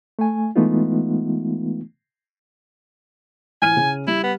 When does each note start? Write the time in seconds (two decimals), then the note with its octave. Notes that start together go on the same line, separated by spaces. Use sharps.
0.19 A3 G#5
0.56 E3 G#3 A3 B3 D#4 F4
3.62 A1 G#5 F6 D#7
3.76 C#3 C#4
4.07 G3 E4
4.24 B3